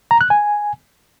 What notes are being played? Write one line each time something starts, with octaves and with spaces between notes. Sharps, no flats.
A#5
F#6
G#5